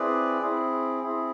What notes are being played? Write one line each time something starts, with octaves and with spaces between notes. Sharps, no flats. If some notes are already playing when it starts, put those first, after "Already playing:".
Already playing: C4 E4 G#4 B4 D5
C4 E4 G#4
C4 E4 G#4